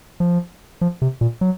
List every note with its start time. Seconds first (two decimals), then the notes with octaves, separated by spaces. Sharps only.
0.20 F3
0.81 F3
1.02 C3
1.21 A#2
1.41 F#3